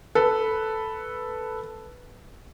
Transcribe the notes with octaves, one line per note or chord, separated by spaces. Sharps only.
A4 B4